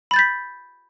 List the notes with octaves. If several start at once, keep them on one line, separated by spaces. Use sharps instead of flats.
B5 G6 A6 B6